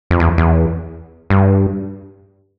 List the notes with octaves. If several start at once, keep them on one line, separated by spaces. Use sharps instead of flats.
F2
E2
E2
G2